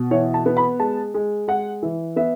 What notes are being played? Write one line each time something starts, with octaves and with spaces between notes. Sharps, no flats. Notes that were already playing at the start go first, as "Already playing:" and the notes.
Already playing: B2
E3 C#5
A5
B3
B5
G#3 A5
G#3
G#3 F#5
E3
B3 E5